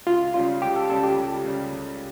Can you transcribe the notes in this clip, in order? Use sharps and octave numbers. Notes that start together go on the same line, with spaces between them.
C#2 F4
C#3 G3 C#4 F4
C#2 G4
A4
C#3 G3 C#4 A4
G4
C#2
C#3 G3 C#4
C#2